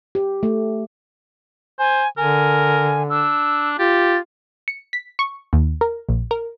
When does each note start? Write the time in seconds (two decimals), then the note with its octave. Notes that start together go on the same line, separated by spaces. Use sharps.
0.15 G4
0.43 A3
1.79 C5 G#5
2.18 D3 A#4 G#5
3.10 D4 E6
3.79 F4 G4 A6
4.68 C#7
4.93 B6
5.19 C#6
5.53 D#2
5.81 A#4
6.09 A#1
6.31 A#4